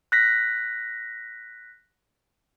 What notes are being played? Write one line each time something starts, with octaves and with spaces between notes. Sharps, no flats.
F#6 A#6 B6